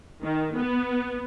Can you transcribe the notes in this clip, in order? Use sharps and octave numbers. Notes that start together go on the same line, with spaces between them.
D#3
B3